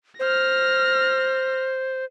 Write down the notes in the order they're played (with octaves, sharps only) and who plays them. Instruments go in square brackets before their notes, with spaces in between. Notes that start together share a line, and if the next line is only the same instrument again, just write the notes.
[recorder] C5 [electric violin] F6 A#6